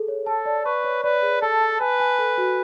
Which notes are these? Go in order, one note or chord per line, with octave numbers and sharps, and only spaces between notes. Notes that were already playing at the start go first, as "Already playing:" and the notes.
Already playing: G#4 A4
C#5
A4 A5
D5
B4 C#6
C#5
B4 D5
G#4
A4 A5
A5
B4 G#5
G#5
A4
F#4